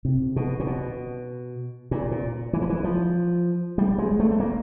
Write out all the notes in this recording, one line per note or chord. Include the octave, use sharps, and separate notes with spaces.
C3
B2
A#2
B2
A#2
A#2
E3
F3
E3
F3
G3
G#3
A3
A3
A#3